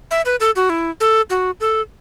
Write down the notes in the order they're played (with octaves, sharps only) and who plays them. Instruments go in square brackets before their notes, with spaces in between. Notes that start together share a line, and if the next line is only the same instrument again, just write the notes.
[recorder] E5
B4
A4
F#4
E4
A4
F#4
A4